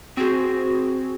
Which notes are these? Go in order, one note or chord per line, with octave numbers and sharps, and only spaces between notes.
C4 F#4 G#4